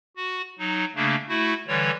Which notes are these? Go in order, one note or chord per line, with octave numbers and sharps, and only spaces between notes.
F#4
F#3 D#4
C#3 A3 A#3 D4
A3 E4 F#4
D3 E3 G3 C#5